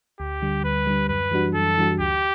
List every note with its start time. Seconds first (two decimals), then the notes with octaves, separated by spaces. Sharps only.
0.20 D2 G4
0.42 D3 G3
0.64 D2 B4
0.87 D3 G3
1.09 F#2 B4
1.31 E3 G3 D4 F#4
1.54 F#2 A4
1.77 E3 G3 D4 F#4
1.99 D2 G4